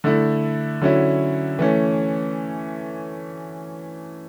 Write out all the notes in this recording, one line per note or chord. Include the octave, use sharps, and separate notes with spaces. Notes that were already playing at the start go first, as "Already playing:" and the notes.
D3 A3 E4
D3 F#3 C#4 E4
E3 A3 C#4